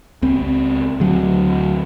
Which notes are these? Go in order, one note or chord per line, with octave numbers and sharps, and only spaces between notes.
C#2 C4
D2 F#3